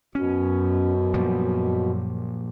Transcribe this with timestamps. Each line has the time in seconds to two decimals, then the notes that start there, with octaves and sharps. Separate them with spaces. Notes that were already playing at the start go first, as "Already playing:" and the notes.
0.15 F#2 B2 C#4
1.14 A#2 F3 G3